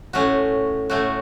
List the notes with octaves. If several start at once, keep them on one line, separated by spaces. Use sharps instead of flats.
A2 A3 C#4 F#4
A2 A3 C#4 F#4